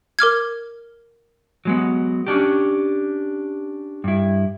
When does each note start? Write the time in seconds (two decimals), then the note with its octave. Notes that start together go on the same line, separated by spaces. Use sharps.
0.19 A#4 D6 F6 G#6
1.65 F#3 G#3 B3
2.27 C#4 D4 G4
4.04 G2 E4